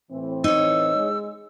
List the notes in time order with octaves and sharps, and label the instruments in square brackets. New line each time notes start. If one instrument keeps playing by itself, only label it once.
[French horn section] A2 E3 C4
[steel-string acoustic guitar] D#4 C#5 [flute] E6
[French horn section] G#3